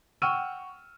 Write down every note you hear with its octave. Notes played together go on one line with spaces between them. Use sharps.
F#5 G5 C#6 E6 F6 D#7